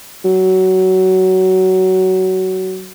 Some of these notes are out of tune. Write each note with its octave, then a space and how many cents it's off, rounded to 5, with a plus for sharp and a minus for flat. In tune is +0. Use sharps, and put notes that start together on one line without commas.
F#3 +20